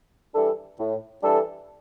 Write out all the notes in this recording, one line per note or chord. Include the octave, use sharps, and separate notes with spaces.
E3 G3 D4 A4
A2
E3 G3 D4 A4